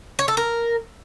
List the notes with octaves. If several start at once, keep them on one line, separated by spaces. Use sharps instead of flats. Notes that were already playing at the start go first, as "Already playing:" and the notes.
C#5
A4
A#4